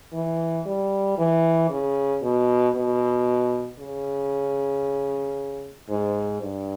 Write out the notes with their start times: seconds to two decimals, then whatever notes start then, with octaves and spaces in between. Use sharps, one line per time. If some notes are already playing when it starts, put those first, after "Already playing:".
0.13 E3
0.66 G3
1.18 E3
1.70 C#3
2.22 B2
2.75 B2
3.79 C#3
5.89 G#2
6.41 G2